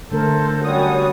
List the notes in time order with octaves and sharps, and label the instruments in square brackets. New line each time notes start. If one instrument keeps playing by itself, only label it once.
[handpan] D3 A3 A#4 [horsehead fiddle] A4 C5
[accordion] F#2 G3 D#6 [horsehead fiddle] F#4 C#5